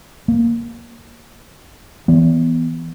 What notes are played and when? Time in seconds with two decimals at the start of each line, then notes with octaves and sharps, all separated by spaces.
0.28 A#3
2.08 E3 B3